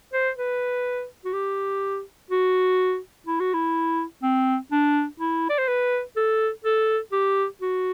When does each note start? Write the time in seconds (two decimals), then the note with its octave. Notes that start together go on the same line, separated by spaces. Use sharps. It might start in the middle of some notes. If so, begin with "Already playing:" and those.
0.13 C5
0.38 B4
1.25 F#4
1.33 G4
2.30 F#4
3.27 E4
3.40 F#4
3.54 E4
4.23 C4
4.72 D4
5.20 E4
5.49 D5
5.58 C5
5.68 B4
6.16 A4
6.65 A4
7.12 G4
7.61 F#4